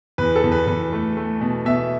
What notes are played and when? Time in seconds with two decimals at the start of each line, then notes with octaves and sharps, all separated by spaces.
0.18 E2 B4
0.36 A4
0.43 E2
0.52 B4
0.67 E2 B4
0.92 A3
1.17 A3
1.41 B2
1.65 B2 E5